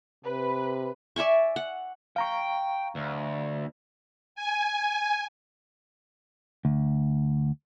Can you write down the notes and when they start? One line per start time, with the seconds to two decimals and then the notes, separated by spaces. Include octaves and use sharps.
0.24 C3 B4
1.16 D5 E5 G#5 C#6
1.56 F#5
2.16 F5 G5 A#5 C#6
2.96 D2
4.35 G#5
6.65 D2